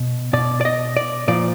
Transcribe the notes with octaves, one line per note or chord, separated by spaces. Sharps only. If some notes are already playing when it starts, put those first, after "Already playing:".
Already playing: B2
B2 D5
D5
D#5
D5
A#2 F3 D5